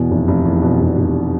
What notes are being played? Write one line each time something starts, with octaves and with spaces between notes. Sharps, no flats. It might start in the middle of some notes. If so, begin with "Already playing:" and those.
Already playing: E2 B2
F1
F1
E2
B2
F1
F1